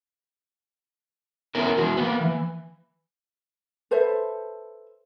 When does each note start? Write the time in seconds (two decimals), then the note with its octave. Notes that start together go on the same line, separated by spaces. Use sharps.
1.55 B3 C#4 E4 A#4
1.77 E3 E4 F#4
1.97 A#3 B3
2.21 E3
3.91 A4 B4 C5 E5